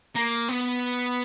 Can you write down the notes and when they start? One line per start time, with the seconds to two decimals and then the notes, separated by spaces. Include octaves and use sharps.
0.15 A#3
0.48 B3